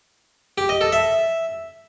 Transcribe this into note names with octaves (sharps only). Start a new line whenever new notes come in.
G4
D#5
A4
E5